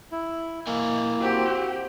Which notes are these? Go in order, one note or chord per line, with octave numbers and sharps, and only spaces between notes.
E4
A#3 E4 D#5 G#5
C4 F#4 G4